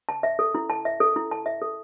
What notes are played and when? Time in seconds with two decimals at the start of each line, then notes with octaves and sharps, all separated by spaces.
0.09 A5
0.23 E5
0.39 A4
0.55 E4
0.70 A5
0.85 E5
1.00 A4
1.16 E4
1.31 A5
1.46 E5
1.62 A4